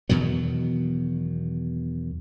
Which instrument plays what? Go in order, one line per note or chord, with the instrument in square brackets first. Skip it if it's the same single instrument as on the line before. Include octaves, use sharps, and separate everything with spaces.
[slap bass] E2 B2 D#3 F#3